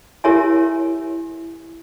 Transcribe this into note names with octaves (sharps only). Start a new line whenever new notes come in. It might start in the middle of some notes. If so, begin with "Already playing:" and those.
E4 G4 A#4 C#5 E5 G#5